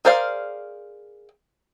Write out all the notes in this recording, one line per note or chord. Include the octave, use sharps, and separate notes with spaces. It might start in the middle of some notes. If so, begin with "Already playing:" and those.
G#4 A#4 C5 D5 F5